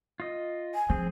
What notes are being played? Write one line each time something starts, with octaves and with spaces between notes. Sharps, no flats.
F4 D#5
G#5
F3 C4 G#4